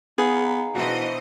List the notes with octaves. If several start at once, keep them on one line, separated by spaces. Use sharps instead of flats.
B3 D#4 G#4 F5
B2 E3 D4 F#4 C5 D#5